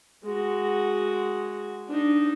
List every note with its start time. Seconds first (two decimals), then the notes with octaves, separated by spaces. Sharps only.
0.24 G#3 F#4
1.88 D4 D#4